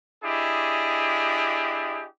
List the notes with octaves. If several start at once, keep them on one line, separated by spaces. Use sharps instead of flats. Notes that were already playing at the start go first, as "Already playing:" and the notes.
D4 E4 G4 G#4 D#5